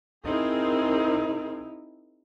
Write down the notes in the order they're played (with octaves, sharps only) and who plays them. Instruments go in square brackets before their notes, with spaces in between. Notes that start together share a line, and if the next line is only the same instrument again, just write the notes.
[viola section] C4 G#4 A#4 [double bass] D#4 E4